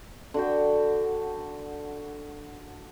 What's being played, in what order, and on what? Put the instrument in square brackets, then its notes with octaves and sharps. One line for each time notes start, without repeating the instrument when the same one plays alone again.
[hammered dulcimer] D3 F#4 G5